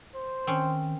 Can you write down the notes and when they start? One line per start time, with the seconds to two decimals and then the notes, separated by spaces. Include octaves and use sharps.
0.15 C5
0.47 D#3 C4 C#4